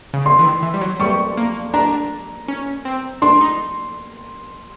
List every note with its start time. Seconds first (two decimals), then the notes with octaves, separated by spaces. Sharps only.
0.14 C#3
0.26 D3 C6
0.39 E3
0.45 D#3
0.63 E3
0.74 G3
0.81 F#3
1.00 G3 C#6
1.37 A#3
1.74 D4 A#5
2.48 C#4
2.85 C4
3.22 D4 C6
3.41 D#4